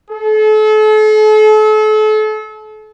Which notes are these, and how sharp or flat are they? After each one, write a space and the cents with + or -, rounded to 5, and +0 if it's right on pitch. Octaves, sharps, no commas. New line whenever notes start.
A4 -40